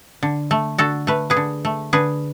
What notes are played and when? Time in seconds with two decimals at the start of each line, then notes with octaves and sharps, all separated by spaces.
0.23 D3
0.51 A3
0.78 D3 F#4 A4
1.07 A3 B4
1.30 G#4 B4
1.37 D3
1.65 A3
1.93 D3 G#4 B4